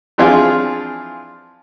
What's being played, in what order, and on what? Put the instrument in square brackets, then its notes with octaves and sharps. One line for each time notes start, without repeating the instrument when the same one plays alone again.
[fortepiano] E3 F3 C4 D4 F4 G#4